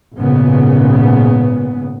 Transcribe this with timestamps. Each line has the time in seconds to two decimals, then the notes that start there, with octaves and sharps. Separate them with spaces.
0.17 G#1 A#2 C#3 B3